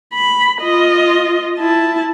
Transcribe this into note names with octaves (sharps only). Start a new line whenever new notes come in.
B5
F4 D#5
E4 A5